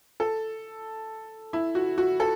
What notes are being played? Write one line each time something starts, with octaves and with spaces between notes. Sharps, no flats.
A4
E4
F#4
F#4
A4